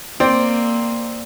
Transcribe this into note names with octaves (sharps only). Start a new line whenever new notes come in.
A#3 C4 D5